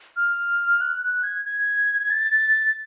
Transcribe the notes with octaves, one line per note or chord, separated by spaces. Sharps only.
F6
F#6
F#6
G#6
G#6
A6